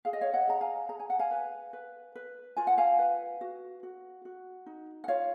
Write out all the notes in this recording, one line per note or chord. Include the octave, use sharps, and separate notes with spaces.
G#4 F5
D#5
C#5 F5
D#5 F#5
G#4 A#5
F5 G#5
G#4 A#5
G#5
F#5
F5 G#5
B4
B4
B4
F4 G#5
F#5
F5 G#5
B4
F#4
F#4
F#4
D#4
F#5
F4 C#5 F5